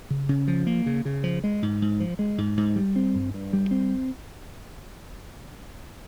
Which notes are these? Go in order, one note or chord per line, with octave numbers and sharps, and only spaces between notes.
C#3
C#3
F3
A#3
C#3
C#3
F3
G#3
G#2
G#2
F3
G#3
G#2
G#2
G3
C4
G2
G2
G3
C4